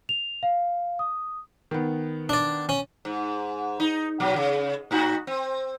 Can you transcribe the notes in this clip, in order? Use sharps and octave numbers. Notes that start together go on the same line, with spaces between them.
F7
F5
D#6
D#3 B3
D4 D5
C#4
G#2
D#4
B2 F#3
C#3
A2 D#4 F#4
C4